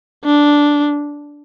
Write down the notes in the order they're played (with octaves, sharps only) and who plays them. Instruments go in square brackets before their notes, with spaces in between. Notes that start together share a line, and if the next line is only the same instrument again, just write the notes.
[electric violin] D4